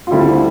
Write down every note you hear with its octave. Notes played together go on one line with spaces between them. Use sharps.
F4
D2 D3 G3 C4 E4